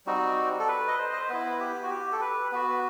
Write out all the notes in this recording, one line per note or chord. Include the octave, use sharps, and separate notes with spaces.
G3 C4 D#4 F#4
A4
B4
D#5
C5
D#5
C5
B3 E4 B4
G4
F#4
G4
A4
B4
B3 F#4 B4